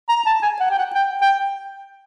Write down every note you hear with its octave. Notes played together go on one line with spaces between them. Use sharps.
A#5
A5
G#5
F#5
G5
F#5
G5
G5